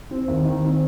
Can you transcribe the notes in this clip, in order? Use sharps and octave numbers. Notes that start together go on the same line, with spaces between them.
C4
D#2
D#3
C4